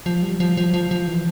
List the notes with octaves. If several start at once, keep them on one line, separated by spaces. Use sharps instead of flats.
F3
G3
F3
F3
F3
F3
E3